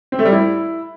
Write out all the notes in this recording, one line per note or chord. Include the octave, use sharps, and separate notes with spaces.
C4
A3
G3
E4